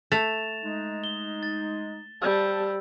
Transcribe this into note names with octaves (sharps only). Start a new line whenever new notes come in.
A3 A6 E7 F7
G#3 D#4
G7
A6
G3 C5 A5 E6 G6